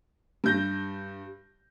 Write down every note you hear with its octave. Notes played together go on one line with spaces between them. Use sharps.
G2 G6 A#6